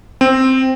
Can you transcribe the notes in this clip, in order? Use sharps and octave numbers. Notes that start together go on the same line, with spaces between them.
C4